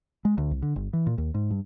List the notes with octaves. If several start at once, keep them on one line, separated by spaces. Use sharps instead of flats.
G#3
D2
C2
D3
G1
E3
A#2
D#2
G#2
G2